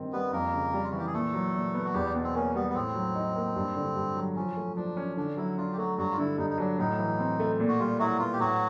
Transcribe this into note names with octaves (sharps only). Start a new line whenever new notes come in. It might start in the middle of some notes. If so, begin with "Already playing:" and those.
Already playing: G2 D#3 C4
G3 B3 B4
F2 A#3 A#4
C#3
G3
F4
E3 F#4
G4
G#4
A#2 A3 A4
F#3
A#2
B3
F#4
E2 G3 G4
B2
C4
A#3 C#4
G3 B3
B3
A2 C4
F#3
D#4
A#3
G2
D3
G2
F#3
F3 C#4
A3
F3 D4
C#4
D3 D4
F#3 E4
D4 F4
G4
F#3 A3 F#4
G2 F#3 F#4
F4
D3 E4
G2 D#4
D#4
F#3 D4
A2 D#4
E3
C4
A3
A#2
F#4
G3 F4
F#3 E4 F#4
B3 F4
G4
A2 F#3 F#4